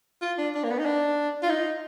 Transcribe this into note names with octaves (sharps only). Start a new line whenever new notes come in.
F4
D4
D4
A#3
B3
D#4
D4
F4
D#4